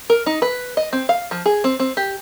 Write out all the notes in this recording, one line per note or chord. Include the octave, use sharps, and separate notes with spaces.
A#4
D#4
B4
D#5
C4
F5
F3
G#4
C4
C4
G4